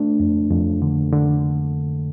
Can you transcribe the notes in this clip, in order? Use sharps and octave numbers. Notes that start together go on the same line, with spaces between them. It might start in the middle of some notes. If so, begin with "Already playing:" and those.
Already playing: A3 D4
F2
F2
D3
D3